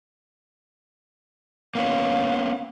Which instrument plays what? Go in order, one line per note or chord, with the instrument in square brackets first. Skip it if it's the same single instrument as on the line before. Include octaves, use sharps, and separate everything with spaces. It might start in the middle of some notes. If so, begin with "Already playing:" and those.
[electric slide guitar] A#3 B3 C#4 [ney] F5